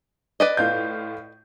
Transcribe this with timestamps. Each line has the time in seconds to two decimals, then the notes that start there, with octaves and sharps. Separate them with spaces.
0.40 B4 D5 D#5
0.57 A2 F4 G6